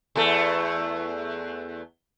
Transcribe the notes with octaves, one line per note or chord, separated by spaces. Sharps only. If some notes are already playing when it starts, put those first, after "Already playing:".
E2 A3